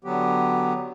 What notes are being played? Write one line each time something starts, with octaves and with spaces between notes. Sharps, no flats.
D3 F#3 B3 G4